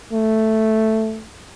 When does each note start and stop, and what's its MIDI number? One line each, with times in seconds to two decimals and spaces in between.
0.13 1.22 57